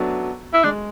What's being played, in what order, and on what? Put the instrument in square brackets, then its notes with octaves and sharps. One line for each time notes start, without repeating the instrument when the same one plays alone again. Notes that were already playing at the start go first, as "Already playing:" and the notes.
Already playing: [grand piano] F#3 A3 B3 D4
[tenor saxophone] E4
[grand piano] G#3 [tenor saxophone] D4